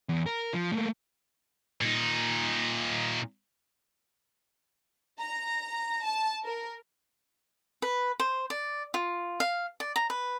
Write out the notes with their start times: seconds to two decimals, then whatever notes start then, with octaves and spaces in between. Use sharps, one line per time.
0.09 E2
0.26 A#4
0.53 F3
0.72 A3 A#3
1.81 A#2 D#4
5.20 A#5
6.05 A5
6.45 A#4
7.82 B4
8.20 C5
8.50 D5
8.94 F4
9.40 F5
9.80 D5
9.96 A#5
10.10 B4